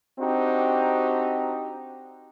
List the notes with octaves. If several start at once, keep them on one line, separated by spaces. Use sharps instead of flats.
C4 D4 D#4 F#4 G4